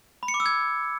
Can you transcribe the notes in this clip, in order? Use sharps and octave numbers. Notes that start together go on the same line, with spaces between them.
B5
C#7
D6
E6
G#6